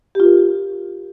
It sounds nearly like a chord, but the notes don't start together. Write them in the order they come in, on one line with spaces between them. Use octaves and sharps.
G4 F4 A#4